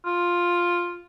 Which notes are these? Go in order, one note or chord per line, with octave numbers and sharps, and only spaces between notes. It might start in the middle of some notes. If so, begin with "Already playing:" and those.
F4